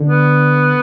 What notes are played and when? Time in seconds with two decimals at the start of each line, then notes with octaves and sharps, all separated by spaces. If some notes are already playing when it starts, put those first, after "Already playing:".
Already playing: D3
0.09 B3